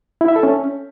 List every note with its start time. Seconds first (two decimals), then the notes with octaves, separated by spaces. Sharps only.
0.21 E4
0.28 E5
0.36 A4
0.43 C#4